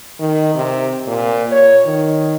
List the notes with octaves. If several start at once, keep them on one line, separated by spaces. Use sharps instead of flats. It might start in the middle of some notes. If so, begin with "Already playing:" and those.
D#3
C3
A#2
C#5
D#3